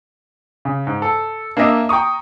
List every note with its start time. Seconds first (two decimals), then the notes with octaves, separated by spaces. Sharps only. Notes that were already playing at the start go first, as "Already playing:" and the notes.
0.65 C#3
0.87 G#2
1.02 A4
1.57 A#3 D4 A#4 D#5 E5
1.89 G5 A#5 C#6 D#6